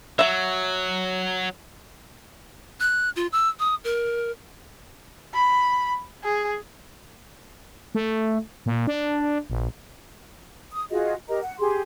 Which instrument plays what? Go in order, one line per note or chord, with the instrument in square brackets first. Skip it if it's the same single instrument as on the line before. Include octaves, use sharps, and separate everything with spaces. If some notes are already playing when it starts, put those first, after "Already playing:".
[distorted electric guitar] F#3 [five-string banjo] E5 F#5
[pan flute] F#6
F4
E6
D#6
A#4
[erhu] B5
G#4
[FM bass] A3
A#2
D4
A#1
[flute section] D#6
F4 F#4 G#4 D#5
G4 A#4 D#5 A#5
F#5
G4 G#4 C6